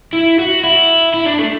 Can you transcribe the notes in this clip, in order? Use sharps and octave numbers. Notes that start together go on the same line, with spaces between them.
E4
F#4
E4
E4
D4
A3